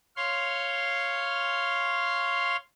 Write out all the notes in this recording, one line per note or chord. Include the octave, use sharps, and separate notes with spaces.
C#5 F5 C6